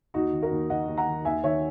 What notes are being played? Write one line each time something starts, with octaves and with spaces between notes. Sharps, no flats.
D#2 D#4 F#4
D#3
F#4 A#4
D#2
D#3 D#5 F#5
D#2
F#5 A#5
D#3
D#2 E5 G#5
D#3 C#5 E5